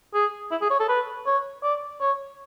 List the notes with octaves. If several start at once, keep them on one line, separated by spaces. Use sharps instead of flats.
G#4
E4
G#4
C#5
A4
B4
C#5
D5
C#5